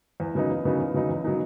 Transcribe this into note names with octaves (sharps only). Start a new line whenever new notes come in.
E2
C#3 F#3 B3 D#4
E2
C#3 F#3 B3 D#4
E2
C#3 F#3 B3 D#4
E2
C#3 F#3 B3 D#4